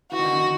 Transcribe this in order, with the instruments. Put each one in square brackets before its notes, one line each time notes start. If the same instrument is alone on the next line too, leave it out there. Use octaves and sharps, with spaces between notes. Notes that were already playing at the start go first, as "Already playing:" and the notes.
[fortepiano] E3 [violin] F#4
[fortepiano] D#3
D3
D#3